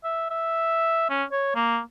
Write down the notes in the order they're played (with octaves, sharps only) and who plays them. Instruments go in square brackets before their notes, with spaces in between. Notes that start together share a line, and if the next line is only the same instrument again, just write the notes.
[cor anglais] E5
E5
C#4
C#5
A#3